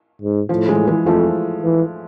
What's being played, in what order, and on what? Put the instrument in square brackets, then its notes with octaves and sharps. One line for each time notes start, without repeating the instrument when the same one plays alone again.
[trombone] G#2
[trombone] A2 [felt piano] F3
[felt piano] E3 G#3
E3 G#3
[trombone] F2 [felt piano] F3 A3
[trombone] E3